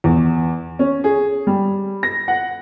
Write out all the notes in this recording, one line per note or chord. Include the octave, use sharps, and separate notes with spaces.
E2
C#4
G#4
G3
A#6
F#5